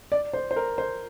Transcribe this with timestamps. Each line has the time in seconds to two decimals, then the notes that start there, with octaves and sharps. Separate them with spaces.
0.12 D5
0.33 C5
0.51 C5
0.56 A#4
0.78 C5